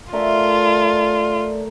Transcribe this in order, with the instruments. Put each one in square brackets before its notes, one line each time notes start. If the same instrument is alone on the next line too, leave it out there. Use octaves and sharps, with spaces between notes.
[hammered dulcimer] A3 A#4 E5 [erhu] F4 [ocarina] D5